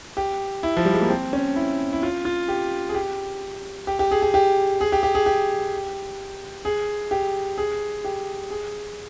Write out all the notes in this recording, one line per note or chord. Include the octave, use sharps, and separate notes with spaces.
G4
E4
F3
G3
G#3
A#3
C4
C#4
E4
E4
F4
F4
G4
G#4
G4
G4
G4
G#4
G#4
G4
G#4
G4
G4
G#4
G4
G#4
G4
G#4
G4
G#4